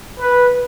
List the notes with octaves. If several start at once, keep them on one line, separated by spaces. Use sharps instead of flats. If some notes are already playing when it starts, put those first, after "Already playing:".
B4